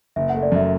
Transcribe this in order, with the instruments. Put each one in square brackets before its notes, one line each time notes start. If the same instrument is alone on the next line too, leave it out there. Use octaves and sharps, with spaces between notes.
[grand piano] F#1 [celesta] E5
[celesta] F#5
[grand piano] A3
[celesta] D5
[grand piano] F#2 [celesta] E5